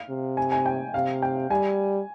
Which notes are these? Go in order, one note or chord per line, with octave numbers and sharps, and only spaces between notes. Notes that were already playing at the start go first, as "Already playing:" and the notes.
Already playing: F5
C3
G#5
G#5
G5
C3 F5
G5
G3 G#5